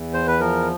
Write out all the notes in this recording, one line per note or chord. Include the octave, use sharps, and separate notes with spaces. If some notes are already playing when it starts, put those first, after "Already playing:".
Already playing: E2
C5
B4
F3 A#4